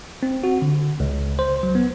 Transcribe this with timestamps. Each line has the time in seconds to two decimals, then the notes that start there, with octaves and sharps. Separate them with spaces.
0.23 C4
0.44 F#4
0.62 D3
1.00 C#2
1.39 C5
1.63 F#3
1.75 B3